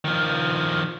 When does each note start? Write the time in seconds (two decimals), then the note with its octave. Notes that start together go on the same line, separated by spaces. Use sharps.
0.05 D#3 F3